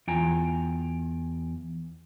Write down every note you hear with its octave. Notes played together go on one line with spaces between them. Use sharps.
E2 F4 G5 G#5 A#5